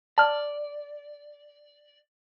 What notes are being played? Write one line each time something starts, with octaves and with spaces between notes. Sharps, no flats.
D5 A5 F6